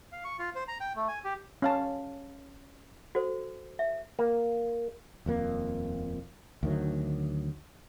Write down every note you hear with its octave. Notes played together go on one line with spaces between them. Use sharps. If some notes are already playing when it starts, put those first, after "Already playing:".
F5
C#6
F4
C5
A#5
G5
A3
G#5
G4
C#4 F5 A5
F#4 A4 C5
E5
A#3
D#1 F2 A#3
D2 D#3 F#3